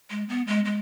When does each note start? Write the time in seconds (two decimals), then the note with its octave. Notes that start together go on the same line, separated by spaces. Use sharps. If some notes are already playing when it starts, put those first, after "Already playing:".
0.11 G#3
0.29 B3
0.47 G#3
0.65 G#3